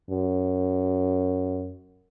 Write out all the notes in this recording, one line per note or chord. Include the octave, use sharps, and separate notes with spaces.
F#2